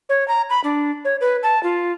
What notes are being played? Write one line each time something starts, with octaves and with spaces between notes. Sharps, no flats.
C#5
A#5
B5
D4
C#5
B4
A5
F4